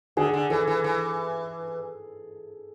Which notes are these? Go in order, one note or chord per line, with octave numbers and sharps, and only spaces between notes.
D3 G#4
D3
E3 A4
E3
E3